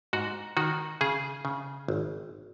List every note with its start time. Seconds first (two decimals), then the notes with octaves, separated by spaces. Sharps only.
0.13 G#2 F#4
0.57 D#3 F#4
1.01 C#3 G#4
1.45 C#3
1.88 G#1